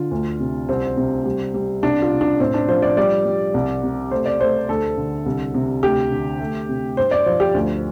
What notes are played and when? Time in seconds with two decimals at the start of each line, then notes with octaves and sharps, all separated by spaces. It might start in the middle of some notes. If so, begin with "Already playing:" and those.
Already playing: D3 F4
0.11 D2
0.40 C3
0.69 C2 C4
0.97 C3
1.25 G3
1.54 G3
1.83 C2 D4
2.02 F4
2.11 C3
2.21 D4
2.40 A2 C4
2.54 D4
2.68 F3 C5
2.82 D5
2.97 G3 D5
3.25 G3
3.54 C2
3.83 C3
4.11 A3 C5
4.26 D5
4.40 A3 C5
4.69 D2 A4
4.98 D3
5.26 C2
5.54 C3
5.83 D2 G4
6.12 D3
6.40 A3
6.69 C3
6.97 G2 C5
7.11 D5
7.26 F3 C5
7.40 G4
7.54 D2